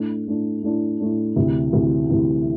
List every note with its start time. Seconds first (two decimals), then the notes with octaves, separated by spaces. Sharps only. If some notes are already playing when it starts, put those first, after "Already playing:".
Already playing: A2 A3 D4
0.27 A2 A3 D4
0.63 A2 A3 D4
1.00 A2 A3 D4
1.36 D2 C3 E3
1.73 D2 C3 E3
2.09 D2 C3 E3